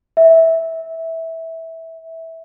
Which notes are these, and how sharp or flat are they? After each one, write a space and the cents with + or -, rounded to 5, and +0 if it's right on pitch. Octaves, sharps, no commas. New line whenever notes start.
E5 -15